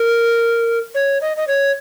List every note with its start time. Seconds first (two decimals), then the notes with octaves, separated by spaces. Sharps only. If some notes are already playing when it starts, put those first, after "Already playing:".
Already playing: A#4
0.95 C#5
1.21 D#5
1.37 D#5
1.48 C#5